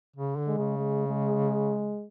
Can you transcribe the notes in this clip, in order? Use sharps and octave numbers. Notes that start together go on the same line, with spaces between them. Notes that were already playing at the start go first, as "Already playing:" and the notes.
C#3
D3
G#3
C#3
G#3
G#3